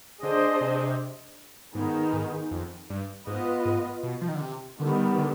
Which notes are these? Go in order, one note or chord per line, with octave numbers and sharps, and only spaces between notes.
D3 D4 G#4 C5 D#5
C3
G#2 D#3 B3 D#4 G#4
G#2
F2
G2
G#2 B3 F4 B4 D#5
G#2
B2
F3
D#3
D3
C3
D3 D#3 G3 B3
D3